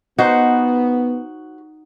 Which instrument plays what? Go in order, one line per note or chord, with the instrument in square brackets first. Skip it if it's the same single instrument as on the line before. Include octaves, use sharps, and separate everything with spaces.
[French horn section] B3 [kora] D#4 C5 [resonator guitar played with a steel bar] F#4